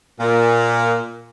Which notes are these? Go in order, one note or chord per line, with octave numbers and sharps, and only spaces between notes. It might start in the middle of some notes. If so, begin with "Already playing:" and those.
A#2